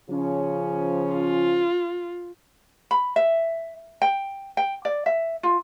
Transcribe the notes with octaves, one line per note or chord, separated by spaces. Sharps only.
C#3 F3 C#4
F4
B5
E5
G5
G5
D5
E5
F4